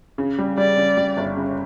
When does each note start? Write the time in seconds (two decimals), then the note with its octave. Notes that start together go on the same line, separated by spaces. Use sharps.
0.18 C#3
0.39 G3
0.57 G3 D5
0.77 C#3
0.97 G3
1.17 G1
1.36 C#3